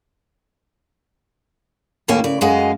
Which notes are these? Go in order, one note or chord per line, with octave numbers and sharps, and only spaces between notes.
D#2 A2 A#3 C#4
C#3 D5
F#2 F#3 G#3 D#5 F5